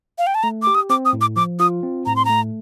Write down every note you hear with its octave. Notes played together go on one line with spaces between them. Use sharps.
F5
G5
A5
A3 A#5
G4 D6
D#6
C4 D6
D#6
A2
D6
F3 D6
F4 D#6
C4
A2 A#5
C6
A3 A#5